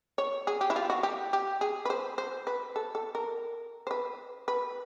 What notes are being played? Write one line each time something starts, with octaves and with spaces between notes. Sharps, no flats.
C#5
G#4
G4
E4
F4
F#4
G4
G4
G#4
B4
C5
C5
B4
A4
A4
A#4
C5
B4
B4